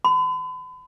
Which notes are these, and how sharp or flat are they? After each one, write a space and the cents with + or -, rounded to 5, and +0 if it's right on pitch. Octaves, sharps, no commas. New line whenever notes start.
B5 +40